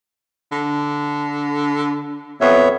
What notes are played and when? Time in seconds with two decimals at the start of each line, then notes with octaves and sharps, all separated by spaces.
0.52 D3
2.41 F2 B3 C#5 E5